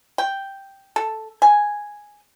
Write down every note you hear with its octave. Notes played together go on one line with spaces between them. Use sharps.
G5
A4
G#5